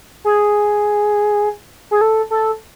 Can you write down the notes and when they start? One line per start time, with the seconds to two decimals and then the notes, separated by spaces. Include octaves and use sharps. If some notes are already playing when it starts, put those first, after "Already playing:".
0.25 G#4
1.91 G#4
2.01 A4
2.31 A4